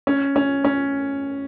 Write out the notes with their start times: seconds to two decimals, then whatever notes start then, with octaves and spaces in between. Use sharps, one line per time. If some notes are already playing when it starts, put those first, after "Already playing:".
0.07 C#4
0.36 C#4
0.64 C#4